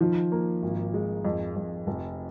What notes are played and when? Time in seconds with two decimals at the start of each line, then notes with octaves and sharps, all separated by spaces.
0.01 D#3 F3
0.32 A#3
0.63 G#1
0.94 G#3
1.25 F2
1.56 F2
1.87 F1